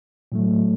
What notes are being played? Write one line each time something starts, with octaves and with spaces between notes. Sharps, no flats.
A2 F#3 A3